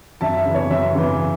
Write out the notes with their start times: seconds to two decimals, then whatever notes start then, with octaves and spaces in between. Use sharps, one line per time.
0.21 F#2 E5 A5
0.37 E5
0.45 C#3 E3
0.55 C#5
0.70 F#2 E5
0.95 C#3 E3